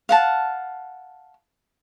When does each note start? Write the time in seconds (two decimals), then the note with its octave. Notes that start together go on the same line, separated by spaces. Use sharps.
0.09 F5 F#5 A5